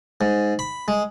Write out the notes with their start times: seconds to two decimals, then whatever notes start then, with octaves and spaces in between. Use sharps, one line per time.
0.21 G#2
0.59 B5
0.88 G#3